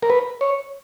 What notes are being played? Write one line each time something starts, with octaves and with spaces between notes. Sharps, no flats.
A#4
B4
C#5